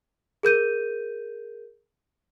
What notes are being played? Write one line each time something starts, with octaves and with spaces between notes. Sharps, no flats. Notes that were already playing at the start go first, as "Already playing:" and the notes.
G#4 A#4 G6 D#7